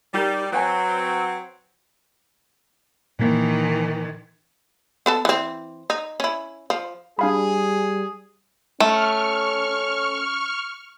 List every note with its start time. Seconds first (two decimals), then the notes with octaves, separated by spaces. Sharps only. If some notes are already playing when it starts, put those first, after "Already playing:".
0.14 G3 D#4 G4 A#4
0.52 F#3 C4 B4 G5 G#5
3.19 A#2 D#3 E3 A#3
5.06 B3 A4 A5
5.25 E3 C4
5.90 D#4
6.20 C#4 E4
6.70 F3
7.19 G3 D4 G#4 F5 B5
8.80 A3 C#4 C#6 F6